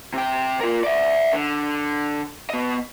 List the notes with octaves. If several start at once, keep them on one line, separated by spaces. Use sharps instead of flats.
C3 G5
F4 A#4
D5 E5
D3
B3 D#5